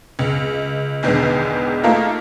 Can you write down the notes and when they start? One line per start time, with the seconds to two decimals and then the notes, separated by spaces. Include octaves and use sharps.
0.19 C#2
1.03 B1 E2 D3 D#3 G#3
1.83 A3 A#3 D#4 F4 A4 A#4